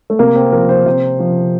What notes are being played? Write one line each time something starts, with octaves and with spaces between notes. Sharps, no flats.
A3
C3 A#3
C4
F3 A#4
C5
C3
F3